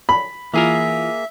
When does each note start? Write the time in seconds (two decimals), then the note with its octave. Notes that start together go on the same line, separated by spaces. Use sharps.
0.09 B5
0.54 E3 A#3 F4 G#4 A#4 E5